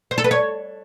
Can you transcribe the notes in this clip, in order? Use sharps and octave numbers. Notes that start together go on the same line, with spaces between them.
C5
A4
B4
C#5